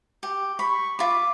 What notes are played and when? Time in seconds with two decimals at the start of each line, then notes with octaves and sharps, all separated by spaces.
0.23 G4
0.59 B5 C#6
0.99 F4 B5 D6